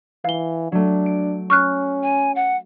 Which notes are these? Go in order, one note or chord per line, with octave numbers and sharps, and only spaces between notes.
E3 F5 G7
F#3 A3 D4
D7
C#4 C#6 F6 F#6
G#5
F#5